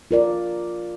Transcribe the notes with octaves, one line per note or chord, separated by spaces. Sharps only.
F4 A#4 D5